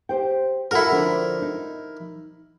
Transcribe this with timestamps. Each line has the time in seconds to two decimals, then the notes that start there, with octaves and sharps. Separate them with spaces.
0.09 G4 C5 G5
0.71 E4 F#4 A4 A#4 F#5
0.91 D3 F3 D4
1.42 D#4